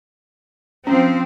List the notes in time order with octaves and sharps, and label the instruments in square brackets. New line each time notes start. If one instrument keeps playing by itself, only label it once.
[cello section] F3 C4 [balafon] C#4